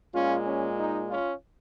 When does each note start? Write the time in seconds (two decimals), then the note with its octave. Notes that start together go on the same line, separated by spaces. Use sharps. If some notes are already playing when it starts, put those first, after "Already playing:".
0.14 A#2 G#3 C#4 F4
0.46 C#4
0.78 D#4
1.10 C#4 F4